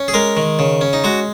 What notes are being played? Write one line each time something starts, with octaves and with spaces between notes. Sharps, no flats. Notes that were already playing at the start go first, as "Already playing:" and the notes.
Already playing: C#4
G#4
G#3 A#4
D#3
C#3
C#4
D#4
G#3 F#4